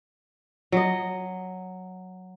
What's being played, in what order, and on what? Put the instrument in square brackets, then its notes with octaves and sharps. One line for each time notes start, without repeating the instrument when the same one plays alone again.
[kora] F#3 D#5